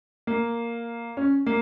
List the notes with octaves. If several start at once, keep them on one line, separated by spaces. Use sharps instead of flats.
A#3
C#4
A#3